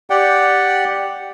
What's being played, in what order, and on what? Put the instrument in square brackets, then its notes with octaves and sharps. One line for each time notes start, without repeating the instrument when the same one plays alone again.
[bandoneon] G4 D5 F#5 G5